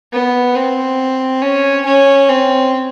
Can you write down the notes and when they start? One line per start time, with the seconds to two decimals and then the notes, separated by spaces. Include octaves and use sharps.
0.13 B3
0.55 C4
1.41 C#4
1.86 C#4
2.29 C4